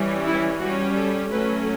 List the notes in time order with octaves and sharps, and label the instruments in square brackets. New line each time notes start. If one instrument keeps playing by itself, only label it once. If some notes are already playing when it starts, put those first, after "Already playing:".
Already playing: [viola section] E3 G3 C#4
E4
G3 C#4 F#4
A4
F#3 A3 C#4 B4